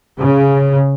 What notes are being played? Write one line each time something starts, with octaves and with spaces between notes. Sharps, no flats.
C#3